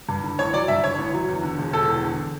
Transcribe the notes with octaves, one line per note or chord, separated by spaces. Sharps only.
G2
D3
A1 C#5
F#3 D5
G2 E5
D3 C#5
A1
F#3
E2
D3
E1
E1 A4
E2
D3